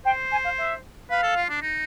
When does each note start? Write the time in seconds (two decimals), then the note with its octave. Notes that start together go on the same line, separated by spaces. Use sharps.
0.05 C5 G5
0.31 G#5
0.44 F5
0.57 E5
1.09 B4 F5
1.23 A4
1.36 F4
1.49 D4
1.62 D#4